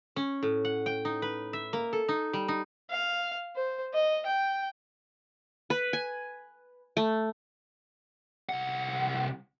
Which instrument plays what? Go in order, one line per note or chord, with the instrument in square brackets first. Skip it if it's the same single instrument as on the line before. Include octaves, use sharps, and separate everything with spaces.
[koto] C#4
A2
F#5
G5
D#4
B4
E5
A#3
A4
D#4
G3
D#4
[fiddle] F5
C5
D#5
G5
[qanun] B4
G#5
A3
[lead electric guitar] C2 F#5